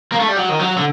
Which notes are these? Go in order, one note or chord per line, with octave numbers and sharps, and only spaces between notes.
A#3
A3
G3
F#3
D#3
F#3
D3